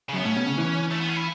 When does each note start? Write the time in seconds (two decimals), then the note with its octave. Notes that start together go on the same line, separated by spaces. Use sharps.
0.09 C#3
0.13 F#2
0.16 B3
0.25 A2 C#4
0.36 B2
0.47 C#3
0.58 E3
0.91 A3
1.00 B3
1.09 C#4
1.16 E4